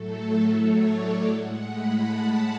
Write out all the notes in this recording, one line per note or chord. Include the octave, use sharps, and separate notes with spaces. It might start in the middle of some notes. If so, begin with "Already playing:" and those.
Already playing: A2 F#3 A3 A4
C#5
D5
A2 G#3 F#5
B5
A5